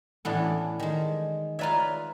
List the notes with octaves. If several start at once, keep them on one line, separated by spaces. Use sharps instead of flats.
A2 E3 B3 C#4 D4 A4
D#3 G#3
F4 B4 C#5 D5 E5 A#5